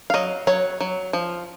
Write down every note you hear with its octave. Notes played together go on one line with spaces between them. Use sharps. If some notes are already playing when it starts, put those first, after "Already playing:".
F5
F#3 D#5
F#3 C#5
F#3
F3